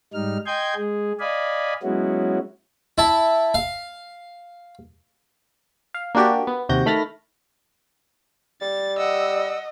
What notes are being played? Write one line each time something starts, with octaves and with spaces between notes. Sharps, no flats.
G#2 G3 D#4 F6
D#5 G5 G#5 C6 G6 G#6
G#3 G#4
D5 D#5 F5 G#5 B5
F#3 G#3 B3 C#4 E4 F#4
E4 A5
F5
F5
A#3 D4 F#4 G4 D5
B3
D#2 C3 F#4 G6 A#6
D#3 A3 B5 F6 A6 A#6
G3 A6
D#5 F#5 E6